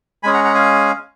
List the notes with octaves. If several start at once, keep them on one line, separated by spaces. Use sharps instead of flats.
G#3 C#4 G#4 G#5 B5
F#5 A#5
F#5 A#5
F5 G#5